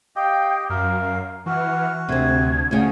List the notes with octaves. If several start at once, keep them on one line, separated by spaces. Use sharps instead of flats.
G4 D#5 F5 G5 G6
F#2 A#4 F5
E3 F#4 F#5 F6
D2 C3 C4 G#6
D2 C#3 F#5